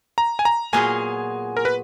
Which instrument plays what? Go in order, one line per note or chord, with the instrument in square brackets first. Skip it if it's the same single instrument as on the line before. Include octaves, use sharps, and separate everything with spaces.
[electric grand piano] A#5
G#5
A#5
[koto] A#2 F#3 B3 F4 G#4 [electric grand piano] G#5
[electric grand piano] A#4
B4